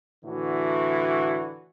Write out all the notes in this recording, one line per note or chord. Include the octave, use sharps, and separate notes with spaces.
A2 D3 E3 F#4